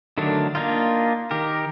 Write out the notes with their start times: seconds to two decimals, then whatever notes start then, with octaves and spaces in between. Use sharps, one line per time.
0.18 D3 D#3 F#3 A3 D4
0.55 A#3 D4 D#4 F4
1.31 D#3 G4 A#4